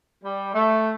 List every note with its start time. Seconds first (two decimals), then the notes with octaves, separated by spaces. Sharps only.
0.24 G3
0.54 A3